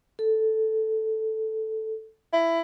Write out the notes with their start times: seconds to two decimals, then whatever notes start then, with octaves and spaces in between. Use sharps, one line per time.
0.19 A4
2.33 E4